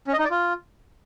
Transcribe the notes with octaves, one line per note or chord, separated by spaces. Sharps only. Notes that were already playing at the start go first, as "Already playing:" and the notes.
C#4
D#5
D#4
D5
F4